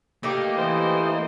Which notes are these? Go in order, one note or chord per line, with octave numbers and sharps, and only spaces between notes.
A3 A#3 D#4 G4
E3 C5 D#5